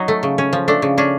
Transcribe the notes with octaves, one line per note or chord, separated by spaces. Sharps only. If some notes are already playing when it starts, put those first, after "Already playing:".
Already playing: F#3 D#4
A3
C#3
C#4
F3
A3 D4
C#3
C#4 D4